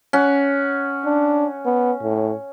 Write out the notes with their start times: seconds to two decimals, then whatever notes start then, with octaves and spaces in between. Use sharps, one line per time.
0.13 C#4 F#5
1.05 D4
1.66 B3
2.03 A2